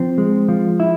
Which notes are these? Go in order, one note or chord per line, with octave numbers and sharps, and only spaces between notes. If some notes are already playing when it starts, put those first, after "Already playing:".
Already playing: F3 C4
G#3
F3
E4